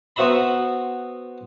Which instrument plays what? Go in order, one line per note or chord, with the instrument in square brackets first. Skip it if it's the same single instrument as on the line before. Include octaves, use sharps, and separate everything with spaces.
[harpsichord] B3 C4 F#4 E5 A#5 B5